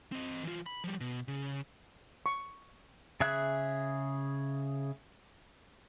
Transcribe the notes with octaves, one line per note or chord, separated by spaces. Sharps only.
C4 D#5
E3 F4
B5
F3 G3
B2
C#3
C#6
C#3 G#4 E5 F#6